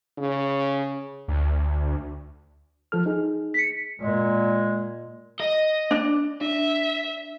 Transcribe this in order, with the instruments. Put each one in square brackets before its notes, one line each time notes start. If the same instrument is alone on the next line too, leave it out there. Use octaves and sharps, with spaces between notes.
[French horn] C#3
[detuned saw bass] D2
[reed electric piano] F3 A4 F6
D#4 G#4
[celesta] B6 C#7
[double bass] A#2 [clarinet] G#3
[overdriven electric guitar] D#5
[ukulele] D4
[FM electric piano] D4 [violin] E5